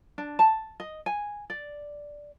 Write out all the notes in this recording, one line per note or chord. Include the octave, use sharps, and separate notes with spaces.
D4
A5
D#5
G#5
D5